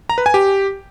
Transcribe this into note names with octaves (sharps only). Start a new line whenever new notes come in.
A#5
B4
G#5
G4